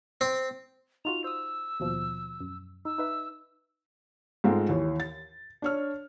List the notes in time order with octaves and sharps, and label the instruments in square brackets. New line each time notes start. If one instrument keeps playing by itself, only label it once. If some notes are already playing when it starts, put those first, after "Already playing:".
[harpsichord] C4
[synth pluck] D#4 F4 F#4 [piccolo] F7
[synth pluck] C5 D#6 [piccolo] E6
[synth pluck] D#2 B2 F3
F#2
[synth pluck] D#4 [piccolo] E6
[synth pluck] D#4 B4 E5
[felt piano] G#2 G#3 A3 C4 F4
D#2 E3 C#5
A6
D4 C#5 F6